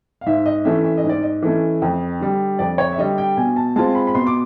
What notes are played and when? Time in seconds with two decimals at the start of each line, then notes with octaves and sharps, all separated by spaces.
0.21 F5
0.26 G#2 E5
0.46 D#5
0.65 E3 A3 C#4 E5
0.84 E5
0.97 D#5
1.04 G#2
1.09 D5
1.23 D#5
1.42 E3 A3 C#4
1.82 F2
2.20 D3 G3
2.59 F2 D5
2.78 C#5
2.92 E5
2.98 D3 G3 D#5
3.18 G5
3.37 B2 G#5
3.56 A5
3.76 G#3 C4 F4 A5
3.95 B5
4.07 B5
4.15 B2 C6
4.27 D6